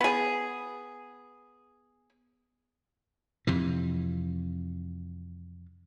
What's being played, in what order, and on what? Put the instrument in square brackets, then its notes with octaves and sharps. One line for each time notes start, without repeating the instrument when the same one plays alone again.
[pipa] B3 G#4
[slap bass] F2 C3 E3